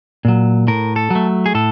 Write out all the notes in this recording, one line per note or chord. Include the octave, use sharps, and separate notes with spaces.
A#2 F#3
A2 A#4
A4
F#3 A3
G#4
A2 A4